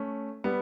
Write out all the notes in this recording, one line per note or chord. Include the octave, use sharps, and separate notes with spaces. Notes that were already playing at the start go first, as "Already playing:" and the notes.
Already playing: A3 C#4
G3 B3